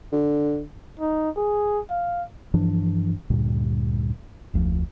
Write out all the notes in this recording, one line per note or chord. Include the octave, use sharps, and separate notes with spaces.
D3
D#4
G#4
F5
G2 E3 F3 D4
D2 G2 A#2
F1 D2 A#2 F3